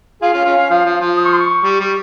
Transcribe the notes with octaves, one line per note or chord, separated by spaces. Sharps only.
F4 G#4 F5
C#4 F4
C#4 F4
C#4
F3
F3
F3
D#6
C#6
C6
C#6
G3
G3